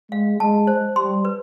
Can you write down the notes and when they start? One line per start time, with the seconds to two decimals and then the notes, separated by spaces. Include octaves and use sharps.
0.11 G#3 F5
0.40 G#3 A5
0.67 C5
0.96 G3 C6
1.25 B4